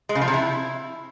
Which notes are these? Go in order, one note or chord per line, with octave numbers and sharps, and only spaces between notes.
G#3
C#3
F3
C3
E4